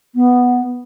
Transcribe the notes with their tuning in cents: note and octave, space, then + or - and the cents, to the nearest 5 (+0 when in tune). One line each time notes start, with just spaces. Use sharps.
B3 +0